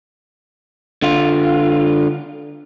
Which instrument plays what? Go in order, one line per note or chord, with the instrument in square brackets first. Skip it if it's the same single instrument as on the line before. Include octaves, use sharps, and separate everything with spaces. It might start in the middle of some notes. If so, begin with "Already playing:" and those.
[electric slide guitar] D3 F4